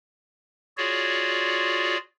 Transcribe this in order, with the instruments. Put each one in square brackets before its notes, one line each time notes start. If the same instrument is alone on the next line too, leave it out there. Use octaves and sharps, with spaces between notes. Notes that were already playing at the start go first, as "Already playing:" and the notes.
[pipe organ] F4 F#4 G#4 C#5 D5